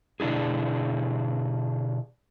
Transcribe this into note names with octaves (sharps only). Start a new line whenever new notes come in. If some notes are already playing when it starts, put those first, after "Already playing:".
B2 D3 D4 E4 G#4